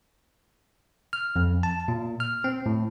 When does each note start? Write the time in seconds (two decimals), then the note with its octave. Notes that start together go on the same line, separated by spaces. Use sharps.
1.13 F6
1.36 F2
1.63 A5
1.88 A#2
2.20 F6
2.44 C4
2.66 A2